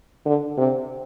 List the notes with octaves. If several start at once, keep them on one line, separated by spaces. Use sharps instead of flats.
D3
C3